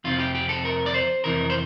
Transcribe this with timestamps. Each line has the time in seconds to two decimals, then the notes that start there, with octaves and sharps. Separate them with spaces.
0.04 F2 C3 F3 F4
0.19 G4
0.35 G4
0.49 A4
0.65 A#4
0.86 D5
0.94 C5
1.24 F2 C3 E3 A#4
1.50 C5